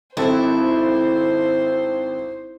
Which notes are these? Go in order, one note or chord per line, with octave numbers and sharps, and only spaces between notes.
G#1 C4 E4 A4 C5